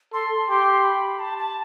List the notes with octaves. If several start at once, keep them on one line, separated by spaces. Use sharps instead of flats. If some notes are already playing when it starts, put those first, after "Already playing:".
A4 C6
G4 C6
B5
A5
A5